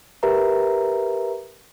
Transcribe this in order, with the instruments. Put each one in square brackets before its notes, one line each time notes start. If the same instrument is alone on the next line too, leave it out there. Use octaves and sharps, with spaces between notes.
[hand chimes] G4 A#4 B4 E5 A#5